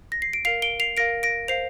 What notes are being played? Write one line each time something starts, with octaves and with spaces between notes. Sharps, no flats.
A#6
C7
D7
A#4 F5 C7 F7
D7 G7
C7 F7
A#4 F5 A#6 D7
A#6 D7
C5 F5 C7 F7